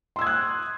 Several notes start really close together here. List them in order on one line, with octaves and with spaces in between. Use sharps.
C6 E6 G#6 D#6 F#6